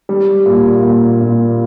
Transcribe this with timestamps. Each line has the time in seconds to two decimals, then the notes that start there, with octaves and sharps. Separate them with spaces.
0.09 G3
0.46 A#2
0.83 A#2
1.21 A#2